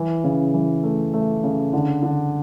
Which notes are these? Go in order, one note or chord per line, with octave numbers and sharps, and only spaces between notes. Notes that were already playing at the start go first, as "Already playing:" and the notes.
Already playing: E3
C#3
E3
A3
A3
C#3
D3
D3